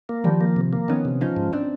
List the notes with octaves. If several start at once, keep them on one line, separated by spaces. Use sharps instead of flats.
A#3
D#3 F3 G3
A#3
C3
A#3
D#3 B3 C#4
C3
F3 C#4 D#4
G#2
C4 D4